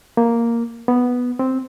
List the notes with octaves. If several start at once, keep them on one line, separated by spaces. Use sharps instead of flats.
A#3
B3
C4